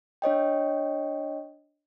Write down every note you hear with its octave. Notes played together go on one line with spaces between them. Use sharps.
D4 C#5 D#5 G5